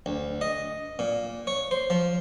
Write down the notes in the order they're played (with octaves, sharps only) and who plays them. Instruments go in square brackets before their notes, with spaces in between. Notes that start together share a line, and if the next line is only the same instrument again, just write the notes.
[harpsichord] D2
D#5
A#2
C#5
C5
F3